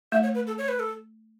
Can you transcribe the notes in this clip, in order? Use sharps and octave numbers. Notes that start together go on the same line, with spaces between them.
A3 E5
C#5
B4
A4
C#5
B4
A4